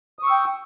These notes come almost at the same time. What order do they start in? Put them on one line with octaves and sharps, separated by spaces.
D#6 C#6 E6 G5